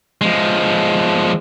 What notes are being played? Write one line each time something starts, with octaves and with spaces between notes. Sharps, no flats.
F3 G#3